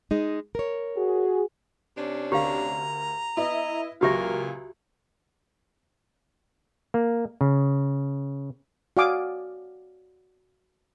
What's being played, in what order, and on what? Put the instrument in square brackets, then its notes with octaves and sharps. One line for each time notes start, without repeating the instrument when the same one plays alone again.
[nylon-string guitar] G#3 D#4
A#4 C#5
[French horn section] F#4 G#4
[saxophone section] C3 C#4 D4
[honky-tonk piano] D2 A#4 [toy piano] G4 F5 [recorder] A#5
[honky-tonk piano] B3 E4 [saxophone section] D#5
[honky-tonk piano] C#2 F#3 [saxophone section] A#2 A#4 F5 [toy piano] F#4 G4 E5
[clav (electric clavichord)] A#3
C#3
[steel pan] F#4 D5 F5 G#5 D6 D#6